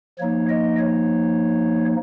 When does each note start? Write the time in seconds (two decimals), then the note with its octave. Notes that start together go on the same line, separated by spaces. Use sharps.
0.19 F3 A#3 D#4 C#5
0.49 D#5
0.78 C#5